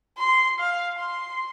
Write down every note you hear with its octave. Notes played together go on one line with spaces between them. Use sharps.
C6
F5
C6